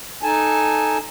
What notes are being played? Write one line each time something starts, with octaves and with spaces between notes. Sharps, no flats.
D#4 A4 G#5 A5